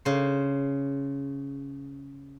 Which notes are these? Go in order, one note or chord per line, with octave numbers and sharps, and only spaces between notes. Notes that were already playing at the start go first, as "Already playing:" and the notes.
C#3 C5